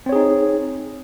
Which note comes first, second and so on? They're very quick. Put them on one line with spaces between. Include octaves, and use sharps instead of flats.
C4 C#5 G#4 D#4